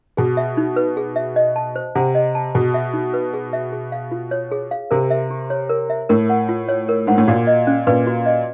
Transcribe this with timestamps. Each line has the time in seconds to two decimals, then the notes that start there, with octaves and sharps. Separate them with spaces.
0.17 B2 G#4
0.37 E5
0.57 D#4
0.76 B4
0.97 G#4
1.16 E5
1.36 D#5
1.56 A5
1.76 C5
1.95 C3 F#5
2.15 D#5
2.35 A5
2.55 B2 G#4
2.74 E5
2.94 D#4
3.14 B4
3.34 G#4
3.53 E5
3.72 G#4
3.92 F5
4.11 F4
4.31 C#5
4.52 G#4
4.71 F5
4.91 C3 A#4
5.11 E5
5.30 G4
5.50 C#5
5.69 A#4
5.90 E5
6.09 A2 A#4
6.30 F#5
6.49 F4
6.69 C#5
6.89 A#4
7.07 G#2 F#5
7.18 A2
7.28 A#2 F#4
7.47 D#5
7.67 C#4
7.87 A#2 B4
8.07 F#4
8.26 D#5